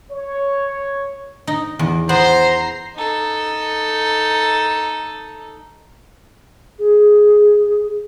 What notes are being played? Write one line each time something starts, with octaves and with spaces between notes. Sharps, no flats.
C#5
D#4
E2
B3 C5 A#5 C7
D#4 A4
G#4